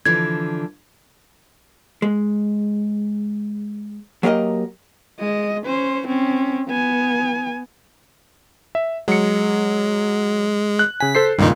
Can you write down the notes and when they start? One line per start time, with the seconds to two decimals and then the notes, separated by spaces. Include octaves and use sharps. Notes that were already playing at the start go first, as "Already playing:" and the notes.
0.06 D3 E3 F3 G#6
2.02 G#3
4.23 F#3 A#3 G4 A#4 D#5
5.19 G#3 D#5
5.66 C#4 C5
6.07 C4 C#4
6.67 B3 G#5
8.75 E5
9.08 F#3 G#3 C#7
10.79 F#6
11.00 C#3 G#5 B6
11.15 A4 C5 C7
11.39 C#2 G2 A#2 D#3 D#4